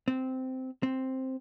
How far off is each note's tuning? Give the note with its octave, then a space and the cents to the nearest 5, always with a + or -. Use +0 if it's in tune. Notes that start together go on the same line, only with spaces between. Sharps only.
C4 -10
C4 +5